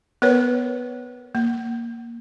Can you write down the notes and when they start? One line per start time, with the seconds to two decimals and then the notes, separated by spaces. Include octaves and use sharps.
0.22 B3 A#4 B4 C#5
1.35 A#3